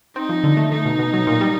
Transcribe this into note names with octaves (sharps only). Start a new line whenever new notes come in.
C4 D#4
F3
D3
A3
A3 D#4
B2
B2
F#3
A#2
G3